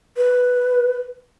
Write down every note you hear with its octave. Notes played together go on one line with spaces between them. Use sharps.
B4